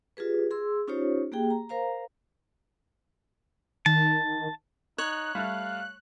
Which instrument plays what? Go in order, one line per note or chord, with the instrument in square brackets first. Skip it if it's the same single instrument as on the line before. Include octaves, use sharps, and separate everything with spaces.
[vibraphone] F4 G4 G#4 B4
G#4 C6 E6
C#4 D#4 F4 G4 C5 C#5
A#3 G4 G#4 G5
A#5
A#4 C5 F5 A#5
[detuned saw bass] D#3 [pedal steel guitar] A5
[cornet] D#4 [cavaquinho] C#5 [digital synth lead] F#6
[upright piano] G3 A3 [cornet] F5